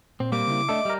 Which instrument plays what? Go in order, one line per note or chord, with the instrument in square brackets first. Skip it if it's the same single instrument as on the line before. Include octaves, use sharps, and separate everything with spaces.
[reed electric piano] A#2 [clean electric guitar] C4
[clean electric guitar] G3 A#3 C4 [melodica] D6
[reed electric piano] C#3 E4
[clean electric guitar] A3 D4 A4 [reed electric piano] D#5 E5
[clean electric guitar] G3 A#4